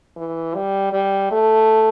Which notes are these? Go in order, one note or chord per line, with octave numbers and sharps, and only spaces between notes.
E3
G3
G3
A3